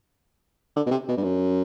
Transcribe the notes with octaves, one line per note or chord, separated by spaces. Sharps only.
D3
B2
C3
B2
G2
F#2